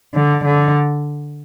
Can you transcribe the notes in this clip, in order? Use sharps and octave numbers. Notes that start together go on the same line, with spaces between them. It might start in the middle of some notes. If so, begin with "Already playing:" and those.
D3
D3